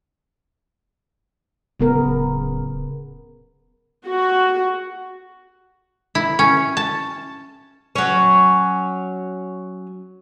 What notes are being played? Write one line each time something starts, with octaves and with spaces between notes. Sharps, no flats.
D1 C#3 B3 A#4
F#4
E4
C#4
A5
F#3 C#4